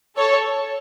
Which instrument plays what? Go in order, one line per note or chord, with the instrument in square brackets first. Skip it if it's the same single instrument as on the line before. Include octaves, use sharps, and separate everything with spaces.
[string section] A4 C#5